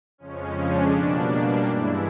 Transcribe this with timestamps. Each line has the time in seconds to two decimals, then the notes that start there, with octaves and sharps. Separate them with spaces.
0.18 F2 C#3 F3 G#3 C#4
0.55 D4
0.92 B2 G3 A#3
1.66 G2 E3 G#3 E4